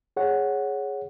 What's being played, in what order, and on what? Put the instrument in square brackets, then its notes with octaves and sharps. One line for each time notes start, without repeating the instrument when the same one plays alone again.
[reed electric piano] G#4 C#5 F#5